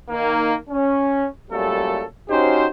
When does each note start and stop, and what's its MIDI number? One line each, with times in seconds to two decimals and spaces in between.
0.10 0.55 51
0.10 0.55 58
0.70 1.25 61
1.51 2.03 42
1.51 2.03 46
1.51 2.03 55
1.51 2.03 57
1.51 2.03 69
2.29 2.67 61
2.29 2.67 63
2.29 2.67 66
2.29 2.67 67
2.29 2.67 72